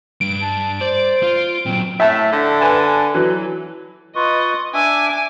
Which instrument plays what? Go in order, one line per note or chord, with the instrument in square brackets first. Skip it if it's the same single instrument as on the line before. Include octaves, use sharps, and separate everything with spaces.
[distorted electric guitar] G2 [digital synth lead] D7
[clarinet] A5
[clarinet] C5 [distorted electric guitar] D5
[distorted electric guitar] F4
[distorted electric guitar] A#2 F#3 [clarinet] C4
[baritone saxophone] A2 [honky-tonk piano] E5 A5
[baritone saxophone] D3
[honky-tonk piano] B4 G#5 A5
E3 F#3
[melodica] F4 B4 C#6 [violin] D#5
[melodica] D4 E5 [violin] G#5 D6